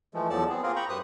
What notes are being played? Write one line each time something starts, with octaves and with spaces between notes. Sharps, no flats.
E3 F3 G#3 A3
E2 F3 F#3 A4 D5 A5
B3 C4 G#4
A#3 C4 F4 G#4 A#4
G5 A#5 B5 C#6
F#2 G4 B4 C5 D#6 F#6